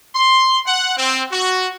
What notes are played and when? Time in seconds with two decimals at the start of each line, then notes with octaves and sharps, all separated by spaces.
0.15 C6
0.67 F#5
0.97 C4
1.32 F#4